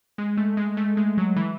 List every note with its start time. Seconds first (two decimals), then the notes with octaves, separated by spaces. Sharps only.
0.18 G#3
0.37 A3
0.57 G#3
0.77 A3
0.97 G#3
1.18 F#3
1.36 E3